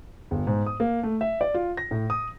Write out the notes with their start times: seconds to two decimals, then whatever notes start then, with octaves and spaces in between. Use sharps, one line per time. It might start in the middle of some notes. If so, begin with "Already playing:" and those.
0.31 G1
0.47 G#2
0.66 D#6
0.80 A#3
1.03 A3
1.21 E5
1.41 D5
1.54 F4
1.77 A#6
1.91 A2
2.10 D#6